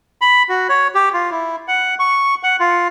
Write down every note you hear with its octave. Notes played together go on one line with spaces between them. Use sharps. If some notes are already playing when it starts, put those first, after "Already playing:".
B5
F#4
C#5
G4
F4
E4
F#5
C#6
F#5
F4